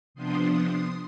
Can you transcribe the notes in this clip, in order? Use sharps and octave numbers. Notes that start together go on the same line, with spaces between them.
C3 F3 B3 D4 C6 D#6
C6 D#6